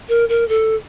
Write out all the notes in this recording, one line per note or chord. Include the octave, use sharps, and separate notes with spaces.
A#4
A#4
A4